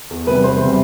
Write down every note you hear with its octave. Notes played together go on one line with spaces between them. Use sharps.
E2
C3 G3 B3 B4
E2 C5
C3 G3 B3